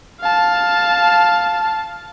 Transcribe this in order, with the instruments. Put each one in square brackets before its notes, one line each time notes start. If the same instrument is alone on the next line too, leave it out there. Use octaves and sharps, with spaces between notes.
[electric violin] F5 A5